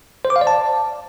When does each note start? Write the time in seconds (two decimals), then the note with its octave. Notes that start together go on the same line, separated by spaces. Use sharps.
0.25 C5
0.30 D6
0.36 F5
0.41 D5
0.47 A5